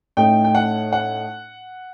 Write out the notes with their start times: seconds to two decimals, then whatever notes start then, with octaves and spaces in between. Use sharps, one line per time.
0.17 A2 A3 D#4 G5
0.44 G5
0.55 F#5
0.93 F#5